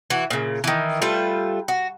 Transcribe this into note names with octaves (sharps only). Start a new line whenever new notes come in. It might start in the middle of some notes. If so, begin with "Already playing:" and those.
E3 F#4
A#2 C#3
D#3 E3
G3 A3 F4 B4
F#4